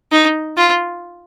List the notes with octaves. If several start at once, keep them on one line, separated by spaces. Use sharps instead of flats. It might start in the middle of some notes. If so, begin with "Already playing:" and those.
D#4
F4